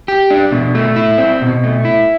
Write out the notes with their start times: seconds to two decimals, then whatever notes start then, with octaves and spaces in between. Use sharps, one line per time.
0.08 G4
0.30 D4
0.52 B2
0.75 A3
0.96 E4
1.18 C4
1.42 B2
1.64 A3
1.85 E4